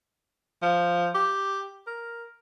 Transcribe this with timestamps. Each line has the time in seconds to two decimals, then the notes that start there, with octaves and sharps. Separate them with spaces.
0.62 F3
1.15 G4
1.87 A#4